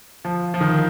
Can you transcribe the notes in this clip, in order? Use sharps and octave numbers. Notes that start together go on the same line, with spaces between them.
F3
F3
D#3